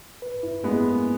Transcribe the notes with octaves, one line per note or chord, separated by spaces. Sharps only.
B4
E4
G#3 A#3 B3
A#3